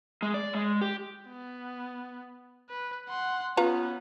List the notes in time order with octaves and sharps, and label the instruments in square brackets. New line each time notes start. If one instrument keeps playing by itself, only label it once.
[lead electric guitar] G#3
D5
G#3
G4
[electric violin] B3
B4
F#5 C6
[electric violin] B3 C#4 [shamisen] F4 B4 A#5